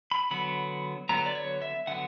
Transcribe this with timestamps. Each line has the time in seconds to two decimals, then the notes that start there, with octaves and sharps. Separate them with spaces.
0.11 B5
0.31 D3 F#3 B3 B5
1.09 D3 F#3 B3 A#5
1.26 D5
1.35 C#5
1.62 E5
1.87 D3 F#3 B3 F#5